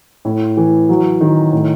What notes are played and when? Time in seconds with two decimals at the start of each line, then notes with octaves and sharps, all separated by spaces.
0.25 A2
0.57 E3
0.89 F#3
1.21 D#3
1.53 A2